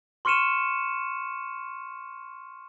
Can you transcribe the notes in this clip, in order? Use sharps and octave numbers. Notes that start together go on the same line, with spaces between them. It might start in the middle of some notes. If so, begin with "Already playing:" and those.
C6 C#6 F6 C#7 D#7 E7